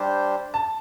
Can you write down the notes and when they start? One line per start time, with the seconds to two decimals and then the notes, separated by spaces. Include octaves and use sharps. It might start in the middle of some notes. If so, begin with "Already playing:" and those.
Already playing: G3 D4 G4 C5
0.54 A5